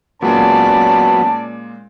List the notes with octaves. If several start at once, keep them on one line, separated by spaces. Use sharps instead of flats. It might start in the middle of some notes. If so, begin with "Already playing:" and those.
A#2 F#3 G#3 B3 C#4 D5 A5